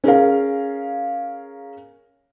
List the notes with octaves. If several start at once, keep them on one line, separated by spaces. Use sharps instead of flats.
C#4 G#4 A#4 F5